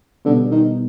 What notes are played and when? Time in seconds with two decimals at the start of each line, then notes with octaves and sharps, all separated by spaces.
0.25 B2 D3 G3 B3
0.51 D#3